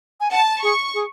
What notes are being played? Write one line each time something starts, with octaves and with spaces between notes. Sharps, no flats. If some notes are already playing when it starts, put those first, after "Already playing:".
G#5
F#5 A5
G#4 C#6
G#4